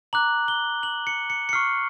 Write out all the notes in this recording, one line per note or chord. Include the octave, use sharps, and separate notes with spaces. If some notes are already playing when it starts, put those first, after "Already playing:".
A#5 D6 F#6 F#7
G7
F#7
C#7
C#7
C#7
C#6 F6 C7